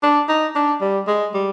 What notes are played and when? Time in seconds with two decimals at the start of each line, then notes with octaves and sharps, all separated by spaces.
0.03 D4
0.29 D#4
0.56 D4
0.81 G3
1.07 G#3
1.34 G3